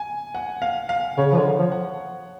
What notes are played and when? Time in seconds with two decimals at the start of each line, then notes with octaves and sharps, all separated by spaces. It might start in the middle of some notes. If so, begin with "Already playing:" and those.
Already playing: G#5
0.35 F#5
0.62 F5
0.89 F5
1.17 C#3 C#5
1.32 F3
1.38 D3
1.58 F3
1.72 F#5